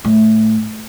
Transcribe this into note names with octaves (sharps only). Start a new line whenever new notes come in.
A2